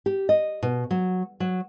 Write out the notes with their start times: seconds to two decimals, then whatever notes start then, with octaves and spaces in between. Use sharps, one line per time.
0.06 G4
0.29 D#5
0.62 B2
0.91 F#3
1.40 F#3